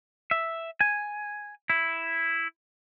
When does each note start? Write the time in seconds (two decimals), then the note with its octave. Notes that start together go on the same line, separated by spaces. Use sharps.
0.31 E5
0.81 G#5
1.70 E4